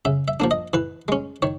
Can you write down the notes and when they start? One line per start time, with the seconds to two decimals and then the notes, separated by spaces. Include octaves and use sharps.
0.05 C#3 E5
0.28 E5
0.40 F3 A#3 D4
0.51 D#5
0.73 E3 B4
1.08 G#3 C#4
1.42 D#3 C#5